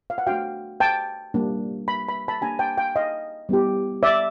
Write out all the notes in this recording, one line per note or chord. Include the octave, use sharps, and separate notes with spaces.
F5
F#5
A3 D4 F#4 F5 G5
G5 A5
G3 A#3 D4
B5
B5
A5 B5
A#3 D4 G4 G#5 A#5
G5 A5
F5 G5
D#5 F5
G3 B3 E4 G4
D5 E5